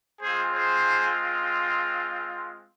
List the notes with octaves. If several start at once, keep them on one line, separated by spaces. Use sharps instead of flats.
G#3 C4 F4 G#4 C5
G#4 C5